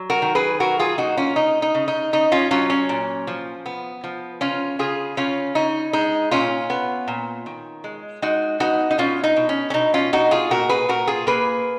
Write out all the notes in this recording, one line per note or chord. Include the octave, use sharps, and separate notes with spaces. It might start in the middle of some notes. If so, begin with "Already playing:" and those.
Already playing: F#3
F#4 A#4
D#3
G#4 B4
F#3 F#4 A#4
F4 G#4
A#3 D#4 F#4
C#4 F4
C#3 D#4
D#4
C#3
D#4
C#3 D#4
C#4 F4
F#3 C#4 F4
C#4
A#2
F3
B3
F3
C#3 C#4 F4
C#3 F4 G#4
C#3 C#4 F4
C#3 D#4
G#3 D#4
A#2 C#4 F4
B3
A#2
D#3
G#3
G#3 D#4 F#4
B3 D#4 F#4
D#4
B2 C#4 F4
D#4
B2
C#4
C#4
B2 D#4
C#4 F4
B2 D#4 F#4
F4 G#4
A#2 F#4 A#4
G#4 B4
A#2 F#4 A#4
F4 G#4
A#3 G#4 B4